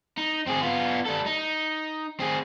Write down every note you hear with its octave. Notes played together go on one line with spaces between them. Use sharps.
D#4
C4 G#4
B3 F4
G3 A4
D#4
C4 G#4